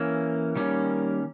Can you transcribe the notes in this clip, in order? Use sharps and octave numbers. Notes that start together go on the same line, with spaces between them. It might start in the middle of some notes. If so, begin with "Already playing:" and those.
Already playing: E3 A#3 C#4
D#3 G3 A#3 C#4